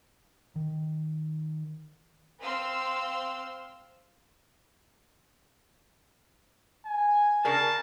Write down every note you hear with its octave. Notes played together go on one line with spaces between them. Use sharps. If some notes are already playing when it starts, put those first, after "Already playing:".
D#3
C4 F5 C6 E6
G#5
C#3 D4 G#4 A#4 A5